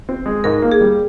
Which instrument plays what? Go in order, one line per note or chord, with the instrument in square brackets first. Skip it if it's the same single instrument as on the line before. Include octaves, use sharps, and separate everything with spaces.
[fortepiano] C4
G#3
[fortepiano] G#2 [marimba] A#4
[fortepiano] A#3
[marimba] G#4
[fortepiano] G3